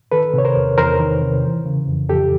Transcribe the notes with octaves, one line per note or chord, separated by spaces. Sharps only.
D#3 A4 B4
C3 C#5
A#4 C5
E2
E2 A#4 C5
D#3
C3
E3
C#3
F2
F2 G4 A4